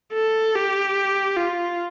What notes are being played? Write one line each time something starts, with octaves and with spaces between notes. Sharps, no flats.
A4
G4
F4